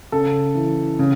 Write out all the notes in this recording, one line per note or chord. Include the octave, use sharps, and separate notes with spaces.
C#3 A4
E3
C#3